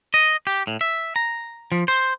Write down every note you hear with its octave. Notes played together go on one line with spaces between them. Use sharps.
D#5
G4
A2
E5
A#5
F3
C5